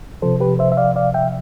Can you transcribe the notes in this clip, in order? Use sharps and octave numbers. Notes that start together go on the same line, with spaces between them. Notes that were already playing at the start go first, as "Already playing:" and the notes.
C3 F3 A4 C5
G4 B4
C5 E5
E5
D5 F5
D5 F5
E5 G5